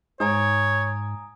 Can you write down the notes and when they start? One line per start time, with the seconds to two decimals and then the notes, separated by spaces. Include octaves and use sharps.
0.20 G#2 C#5 G#5 A#5 D#6